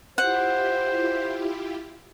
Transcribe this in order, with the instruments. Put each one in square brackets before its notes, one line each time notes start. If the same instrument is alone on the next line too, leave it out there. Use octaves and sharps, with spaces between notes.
[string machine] E4 F4 G4 [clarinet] C5 [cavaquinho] F#5